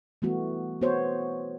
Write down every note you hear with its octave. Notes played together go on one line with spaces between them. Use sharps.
E3 G3 A3 B3 F#4
B3 F#4 C5 C#5